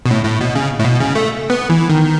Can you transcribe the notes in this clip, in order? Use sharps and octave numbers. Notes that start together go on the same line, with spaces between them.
B2
A2
A2
B2
C#3
A2
B2
C#3
A3
B3
E3
D#3